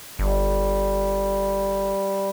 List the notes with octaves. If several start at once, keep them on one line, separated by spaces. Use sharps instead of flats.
G1 G3